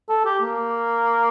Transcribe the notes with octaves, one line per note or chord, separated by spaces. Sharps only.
A4
G4
A#3